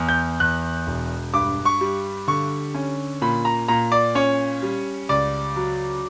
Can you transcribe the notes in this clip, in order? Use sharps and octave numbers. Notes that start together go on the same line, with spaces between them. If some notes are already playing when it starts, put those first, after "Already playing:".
Already playing: E2
G6
E2 F#6
E1
G2 D6
C#6
G3
D3 C#6
C#4
A#2 B5
A#5
A#2 A#5
D5
C#4 C#5
G3
C#2 D5
F#3